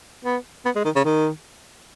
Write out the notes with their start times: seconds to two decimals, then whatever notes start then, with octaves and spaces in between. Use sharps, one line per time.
0.25 B3
0.65 B3
0.76 G#3
0.85 D#3
0.96 C#3
1.05 D#3